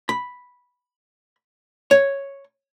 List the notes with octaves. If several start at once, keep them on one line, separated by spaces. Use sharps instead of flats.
B5
C#5